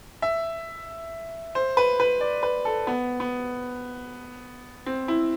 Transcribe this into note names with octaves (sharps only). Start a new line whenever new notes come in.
E5
C5
B4
B4
D5
B4
A4
B3
B3
C4
E4